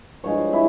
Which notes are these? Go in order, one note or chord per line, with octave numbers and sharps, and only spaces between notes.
G2 F3 G#3 C#5
E4